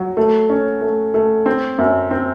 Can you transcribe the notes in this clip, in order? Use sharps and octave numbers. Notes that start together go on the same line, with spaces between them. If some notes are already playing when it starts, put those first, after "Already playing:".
Already playing: F#3 F#4
A3
C#4
A3
A3
C4
F#2
C4